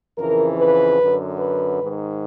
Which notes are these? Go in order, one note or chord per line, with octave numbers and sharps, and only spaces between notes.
F2 C#3 E3 A#4
B4
F#2 D3
B4
G#2 D#3